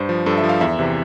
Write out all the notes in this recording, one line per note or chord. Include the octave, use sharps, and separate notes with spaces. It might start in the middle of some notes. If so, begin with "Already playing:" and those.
Already playing: G2 C5
F3
G2 A4
E5
F3
F5
E2 E5
C3 E3